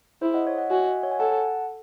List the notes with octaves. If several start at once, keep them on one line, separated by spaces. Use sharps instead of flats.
E4 G#4 C5
D#5 F#5
C#5 E5
D#5 F#5
F#4 E5 G#5
D#5 F#5
C#5 E5
G#5
A4 F#5 A5